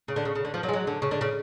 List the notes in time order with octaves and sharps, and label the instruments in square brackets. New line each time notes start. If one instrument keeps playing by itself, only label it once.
[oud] C#3
D3
C#3
C#3
D3
F3
F#3
G#3
F#3
D3
C#3
D3
C#3